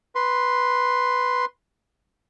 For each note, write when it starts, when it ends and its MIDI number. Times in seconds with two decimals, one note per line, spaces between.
0.15 1.45 71
0.15 1.45 84